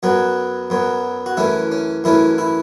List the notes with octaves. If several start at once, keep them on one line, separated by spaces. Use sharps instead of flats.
F#2 F#3 B3 F#4
F#2 F#3 B3
F#4
F#2 E3 A3 C#4 E4
C#4
F#2 E3 A3 C#4 E4
E4